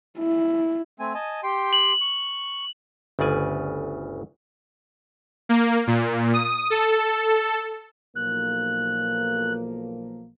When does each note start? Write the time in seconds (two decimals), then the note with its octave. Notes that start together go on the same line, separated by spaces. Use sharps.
0.18 E4
1.00 A3 C4 G#5
1.14 D#5 G#5 A5
1.43 G4 G5 C6
1.73 F#7
2.01 C#6
3.19 G1 D2 C#3 D5 G#5
5.49 A#3
5.87 A#2
6.33 D#6
6.70 A4
8.16 B1 F3 A#3 F#6